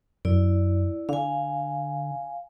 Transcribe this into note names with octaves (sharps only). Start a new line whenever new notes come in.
F#2 E4 D5
D3 F5 G#5